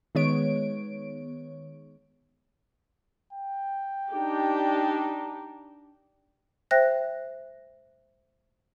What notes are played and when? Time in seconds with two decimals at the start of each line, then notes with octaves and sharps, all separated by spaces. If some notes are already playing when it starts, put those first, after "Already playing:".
0.15 D#3 G#3 B3 C#5 D7
3.33 G5
4.11 D4 D#4 G4
6.71 C5 E5 G5 F#6 A#6